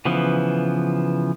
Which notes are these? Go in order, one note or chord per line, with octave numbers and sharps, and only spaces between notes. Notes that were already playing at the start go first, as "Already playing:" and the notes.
C#3 E3 F3 B3